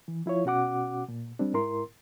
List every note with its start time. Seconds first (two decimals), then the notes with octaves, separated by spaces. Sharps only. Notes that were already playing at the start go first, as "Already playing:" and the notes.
0.08 E3
0.26 F3 E4 F4 C#5
0.45 B2 C#4 F#4 F#5 D6
1.08 A#2
1.39 G3 C4 D4
1.53 G#2 E4 A#4 C6